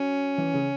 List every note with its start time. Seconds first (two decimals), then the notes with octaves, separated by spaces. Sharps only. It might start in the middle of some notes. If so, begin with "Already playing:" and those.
Already playing: F#3 C#4
0.38 E3
0.54 C#3